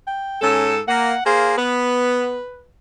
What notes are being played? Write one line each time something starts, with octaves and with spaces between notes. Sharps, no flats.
G5
G#2 C#4 A4
A#3 F#5
A#3 G#4 C5 F5
B3 B4